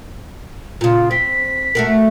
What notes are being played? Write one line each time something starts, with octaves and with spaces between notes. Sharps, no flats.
A#2 C#3 F4
C4 B6
A3 F#4 A#4